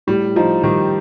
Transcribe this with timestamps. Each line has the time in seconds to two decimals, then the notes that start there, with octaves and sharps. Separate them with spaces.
0.07 A2 G3
0.36 F3 D#4
0.63 D#3 G3